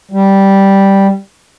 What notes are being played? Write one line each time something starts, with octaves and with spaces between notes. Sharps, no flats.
G3